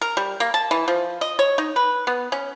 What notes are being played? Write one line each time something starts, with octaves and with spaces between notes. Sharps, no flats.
A#4
G3
A#3
A5
E3
F3
D#5
C#5
D#4
B4
B3
C#4